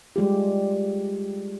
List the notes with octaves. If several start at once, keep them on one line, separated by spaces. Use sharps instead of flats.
G3 G#3 F4 G4